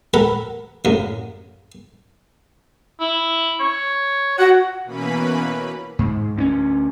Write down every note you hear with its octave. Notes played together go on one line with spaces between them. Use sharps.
A4 A#4 F#5 A#5 B5
F#2 A2 C#3 F#3
E4
C#5
F#4 F#5
B2 E3 A#3 C#4 B4 B5
G#2
D2 C4 C#4